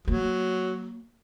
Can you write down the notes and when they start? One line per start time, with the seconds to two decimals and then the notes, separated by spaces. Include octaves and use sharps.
0.08 F#3 A#3